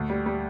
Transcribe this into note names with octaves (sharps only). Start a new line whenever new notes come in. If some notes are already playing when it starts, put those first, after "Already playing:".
Already playing: D2
G3
G3